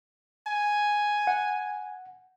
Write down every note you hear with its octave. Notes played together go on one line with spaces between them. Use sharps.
G#5
F#5